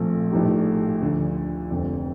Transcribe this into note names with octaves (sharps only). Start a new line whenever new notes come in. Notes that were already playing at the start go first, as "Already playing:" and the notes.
Already playing: A#1 A#2 F3 A3 C4
A#1 A2 A3 D#4 G4
D2 D3 F3
F1 F2 D3